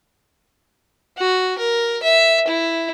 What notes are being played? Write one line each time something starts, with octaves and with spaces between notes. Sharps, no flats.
F#4
A#4
E5
E4